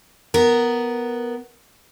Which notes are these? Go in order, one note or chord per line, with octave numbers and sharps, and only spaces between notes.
B3 A#4